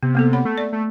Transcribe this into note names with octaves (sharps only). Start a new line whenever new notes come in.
C3 B3
A#3 B3 A4
C#5 F#5 B5
A3
D5
A3